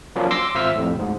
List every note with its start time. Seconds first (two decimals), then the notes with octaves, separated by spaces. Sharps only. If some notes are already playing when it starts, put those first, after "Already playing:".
0.16 F3 F#3 A#3 C#4 D4 F4
0.31 C6 D6 E6 A#6 C7
0.55 G#1 F4 C5 E5 E6 F6
0.75 F2 A2
0.95 D2 G#2